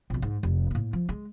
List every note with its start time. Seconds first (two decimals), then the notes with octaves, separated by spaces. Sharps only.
0.10 A#1 B2
0.22 G#2
0.43 F1
0.71 A2 A#3
0.93 F3
1.09 G#3